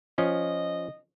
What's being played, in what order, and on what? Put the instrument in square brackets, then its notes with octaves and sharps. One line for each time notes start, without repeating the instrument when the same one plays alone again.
[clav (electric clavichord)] F3 C#4 [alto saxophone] D#5